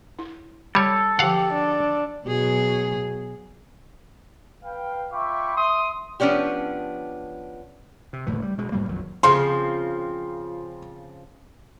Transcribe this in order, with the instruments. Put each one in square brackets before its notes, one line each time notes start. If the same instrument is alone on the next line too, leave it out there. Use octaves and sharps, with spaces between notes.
[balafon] E4
[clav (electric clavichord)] G3 C#5 [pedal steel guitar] A4
[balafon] D3 F3 [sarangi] G4 [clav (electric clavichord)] F5 F#5
[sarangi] D4
[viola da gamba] B2 F#3 G#4
[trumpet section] B4 F5 G5
F4 E5 G5 B5 C#6 D6
E5 C6 D#6
[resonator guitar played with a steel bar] F3 B3 C#4 D4 G4
[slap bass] C3
F#1 D2 A2 E3
G3
B2 G#3
G#2 F#3 G3 A#3
A#1 F2 D#3 F#3
[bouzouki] C#3 F3 C4 [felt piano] C6